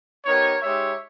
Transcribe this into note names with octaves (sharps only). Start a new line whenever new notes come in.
B3 D#4 G4 A#4 C#5
G#3 D#4 G4 C#5 E5